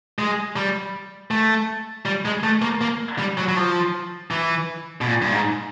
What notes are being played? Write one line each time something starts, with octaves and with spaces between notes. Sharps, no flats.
G#3
G3
A3
G3
G#3
A3
A#3
A#3
G3
F#3
F#3
F3
E3
B2
A#2
G2
G#2